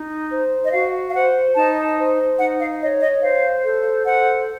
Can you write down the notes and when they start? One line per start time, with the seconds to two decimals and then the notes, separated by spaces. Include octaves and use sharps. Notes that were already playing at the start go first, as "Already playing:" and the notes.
Already playing: D#4
0.31 C5
0.64 D#5
0.72 F#4 F5
1.09 F5
1.14 C5 F#5
1.55 D#4 A5
1.98 C5
2.39 D#4 F#5
2.60 F5
2.81 C#5 D#5
3.01 D#5
3.22 C5 F5
3.64 A4
4.05 C5 F#5